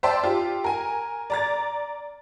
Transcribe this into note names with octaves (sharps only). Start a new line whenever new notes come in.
C5 D5 E5 G5 A5 C6
F4 G4
A#4 G#5
D5 A#5 A6